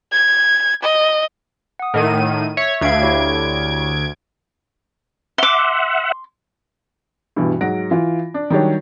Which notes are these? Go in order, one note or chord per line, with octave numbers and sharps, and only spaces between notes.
G#6
D#5
F#5 D#6
A2 D#3 D#7
C#5 E5
D2 E5 F5 G#6 D7
E4 G4 C#5
E5 F#5 C6 D6
G2 B2 E3
G#2 F#3 F#5 A#6 D7
E3 F4
D4
D#3 F#3 G3 D4 G4 C#5